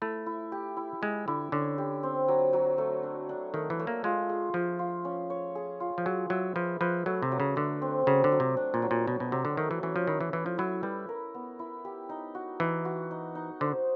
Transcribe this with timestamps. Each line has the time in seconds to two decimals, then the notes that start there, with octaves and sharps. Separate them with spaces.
0.02 A3 E4
0.26 E4
0.52 G4
0.77 E4
1.01 G#3 E4
1.28 D3 E4
1.52 D3 C#4
1.78 G4
2.03 C4
2.28 F#3
2.53 F#3
2.78 A3
3.03 D4
3.29 D4
3.54 D#3 A3
3.70 E3
3.79 A3
3.87 A#3
4.04 G#3 F4
4.29 G#4
4.54 F3 F4
4.79 F4
5.05 C#4
5.30 C#5
5.55 G#4
5.80 F4
5.98 F3
6.06 F#3 G#4
6.30 F#3 E5
6.55 F3 B4
6.81 F3 B4
7.06 F#3 A3
7.22 C3
7.32 F#3
7.40 C#3
7.56 D3 A3
7.82 C4
8.07 C#3 F#3
8.24 D3
8.32 F#3
8.40 C3
8.57 D4
8.74 A#2
8.82 F#3
8.91 A#2
9.07 B2 F#3
9.20 B2
9.32 C3 F#3
9.45 D3
9.57 D#3 A3
9.71 E3
9.83 E3 C#4
9.96 F3
10.07 D#3 E4
10.21 E3
10.33 E3 E4
10.46 F3
10.58 F#3 E4
10.83 G3 B4
11.09 A#4
11.34 B3
11.59 E4
11.85 G4
12.09 D#4
12.35 F#4
12.60 E3 D#4
12.85 F#4
13.11 D#4
13.35 D#4
13.60 D3 C5